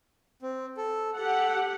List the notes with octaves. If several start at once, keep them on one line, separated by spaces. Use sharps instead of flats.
C4
A4
G4 A4 F#5